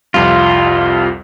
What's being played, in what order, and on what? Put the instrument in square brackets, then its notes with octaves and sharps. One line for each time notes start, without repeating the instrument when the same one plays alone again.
[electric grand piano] C2 F2 G3 [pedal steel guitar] F4